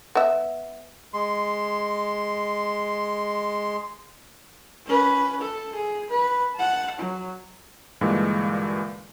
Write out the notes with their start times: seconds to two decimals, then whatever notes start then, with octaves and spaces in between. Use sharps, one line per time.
0.15 B3 E5
1.13 G#3 C6
4.86 C#4 B4
5.41 A4
5.75 G#4
6.10 B4
6.55 F#5 A5
6.98 F#3
8.01 G2 A#2 D3 E3 G#3